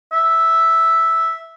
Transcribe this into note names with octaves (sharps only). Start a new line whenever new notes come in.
E5